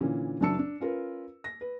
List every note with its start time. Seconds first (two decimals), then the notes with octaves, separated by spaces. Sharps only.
0.01 A#2 D3 E3 A#3 C#4
0.41 F#1 F#3 D4 A5 E6 C#7
0.59 D4
0.80 C#4 F4 A#4 B4
1.44 A#6
1.61 B4